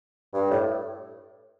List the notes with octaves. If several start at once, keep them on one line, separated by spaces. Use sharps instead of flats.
G2
A2